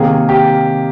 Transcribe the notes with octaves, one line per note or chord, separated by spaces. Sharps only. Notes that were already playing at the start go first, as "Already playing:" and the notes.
Already playing: C3 D#3 A#3 G#4
G4